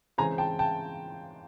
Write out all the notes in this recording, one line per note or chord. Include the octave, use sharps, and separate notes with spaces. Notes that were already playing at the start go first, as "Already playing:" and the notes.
C#3 E3 G#3 C4 G#5 A#5
G5 A5
G5 A5